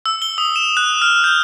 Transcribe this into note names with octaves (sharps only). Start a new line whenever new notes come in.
E6
G7
D#6
E7
F#6
F6
G6